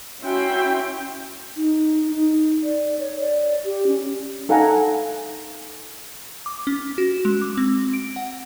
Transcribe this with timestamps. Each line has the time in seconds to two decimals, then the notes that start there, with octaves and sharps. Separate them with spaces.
0.23 C#4 E4 F#4 E5 G5 C6
1.57 D#4
2.11 D#4
2.63 D5
2.99 C#5
3.20 D5
3.65 G4
3.87 C#4
4.49 D#4 A4 F5 F#5 G#5 A#5
6.46 D6
6.67 C#4
6.98 F#4
7.25 G#3
7.42 D6
7.57 C4
7.93 D7
8.16 F#5